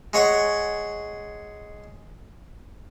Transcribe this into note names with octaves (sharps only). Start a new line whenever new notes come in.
G#3 C#5 F#5 C#6